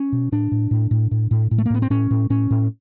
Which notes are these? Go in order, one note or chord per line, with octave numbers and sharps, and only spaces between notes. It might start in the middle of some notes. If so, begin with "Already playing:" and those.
Already playing: C#4
B2
A2 D4
A2
A2
A2
A2
A2
A2
A3
A#3
A2 B3
C4
A2 C#4
A2
A2 C#4
A2